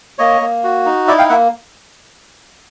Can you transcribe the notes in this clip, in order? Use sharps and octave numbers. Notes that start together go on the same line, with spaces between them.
A#3 C#5 D#5
A#3
F#4
D#4
E4 D5 E5
F5 G5
A#3 E5 F#5